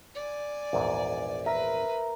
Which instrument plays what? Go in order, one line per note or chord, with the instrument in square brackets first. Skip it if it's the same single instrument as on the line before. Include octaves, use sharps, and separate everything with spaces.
[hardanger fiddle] D5 G#5
[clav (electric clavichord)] A#1 E2 G#2
[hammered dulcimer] A#4 [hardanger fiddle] B4 [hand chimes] E5